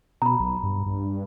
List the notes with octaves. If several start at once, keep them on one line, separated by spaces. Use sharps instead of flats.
B2 A#5 B5
B1
G2
G2